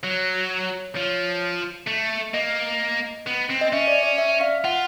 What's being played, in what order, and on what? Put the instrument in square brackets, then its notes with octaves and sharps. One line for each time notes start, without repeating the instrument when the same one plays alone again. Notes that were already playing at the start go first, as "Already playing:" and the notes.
[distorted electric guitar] F#3 [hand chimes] C#5
[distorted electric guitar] F3 [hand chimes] C#5
[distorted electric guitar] A3
[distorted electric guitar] A#3 [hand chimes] D#5
[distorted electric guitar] B3
C4
[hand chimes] D#5
[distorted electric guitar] C#4 [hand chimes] E5
[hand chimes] D5
D5
E5
F5
[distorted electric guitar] F4 [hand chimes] F#5